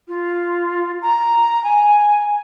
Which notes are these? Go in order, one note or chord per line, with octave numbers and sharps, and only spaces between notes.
F4
A#5
G#5